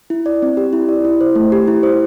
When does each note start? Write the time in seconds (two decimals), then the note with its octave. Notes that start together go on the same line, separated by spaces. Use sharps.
0.10 E4
0.26 D5
0.42 C4
0.57 G4
0.73 E4
0.89 D5
1.05 E4
1.21 C5
1.36 A3
1.52 G4
1.68 E4
1.83 C5